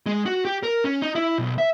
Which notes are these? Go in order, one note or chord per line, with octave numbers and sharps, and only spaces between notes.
G#3
F#4
G4
A#4
C#4
D#4
E4
B1
E5